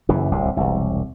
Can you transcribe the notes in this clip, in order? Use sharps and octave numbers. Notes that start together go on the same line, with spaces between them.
F#1 F#2 E3
D1 C2 C3
E1 C2